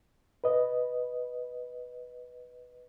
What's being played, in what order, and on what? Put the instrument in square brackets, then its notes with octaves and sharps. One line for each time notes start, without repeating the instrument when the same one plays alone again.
[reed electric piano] B4 D#5